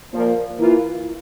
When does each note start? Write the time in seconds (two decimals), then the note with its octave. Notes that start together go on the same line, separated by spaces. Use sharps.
0.13 A#2 F3 A#3
0.58 E3 A#3 F4